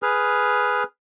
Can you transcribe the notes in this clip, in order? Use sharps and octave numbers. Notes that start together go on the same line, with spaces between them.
G#4 B4 F6